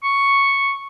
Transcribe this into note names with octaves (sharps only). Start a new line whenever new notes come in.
C#6